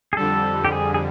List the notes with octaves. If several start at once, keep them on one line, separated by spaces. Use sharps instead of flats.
G#4
F2 D3 G3 A4
G4
G#4
G#4